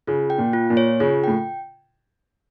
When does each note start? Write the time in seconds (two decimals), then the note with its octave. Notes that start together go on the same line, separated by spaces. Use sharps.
0.07 C#3 F4
0.30 G5
0.38 A#2
0.53 F4
0.70 A#2
0.77 C#5
1.00 C#3 F4
1.24 A2 G5